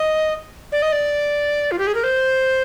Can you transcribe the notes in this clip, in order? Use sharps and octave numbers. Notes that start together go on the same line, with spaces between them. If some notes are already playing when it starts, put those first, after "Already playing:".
Already playing: D#5
D5
D#5
D5
F4
G4
G#4
A#4
C5